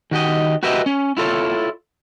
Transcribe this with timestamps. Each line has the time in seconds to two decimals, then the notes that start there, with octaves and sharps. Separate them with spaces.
0.11 D#3 F#4 G4 D#5
0.63 F#4 G4 A#4 B4 D#5 E5
0.86 C#4
1.17 E4 F4 A4 A#4 C#5